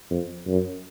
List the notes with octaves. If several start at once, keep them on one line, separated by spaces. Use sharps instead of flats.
F2
F#2